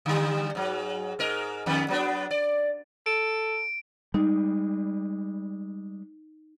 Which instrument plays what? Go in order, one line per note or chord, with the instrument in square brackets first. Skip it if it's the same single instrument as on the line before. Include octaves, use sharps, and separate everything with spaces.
[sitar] D3 G3
G#2 F#3
G#2 A#4 D#5
F2 D#3 B3
F#3 B3 D4
D5
[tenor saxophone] A4 [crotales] D7
[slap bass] G3 G#3 [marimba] D#4